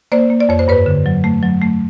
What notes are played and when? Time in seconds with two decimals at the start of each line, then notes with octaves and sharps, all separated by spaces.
0.12 A#3 C5 D5
0.30 A#3
0.40 D5
0.49 F2 C#5
0.59 C5
0.68 G2 B4 C#5
0.86 D3
1.06 F#3
1.24 A3
1.43 F#3
1.62 A3